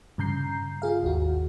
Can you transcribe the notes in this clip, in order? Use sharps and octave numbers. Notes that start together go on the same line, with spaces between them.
G2 C#3 A#5 G6 C7
F4 G#4 F5
G#1 D#2 F#4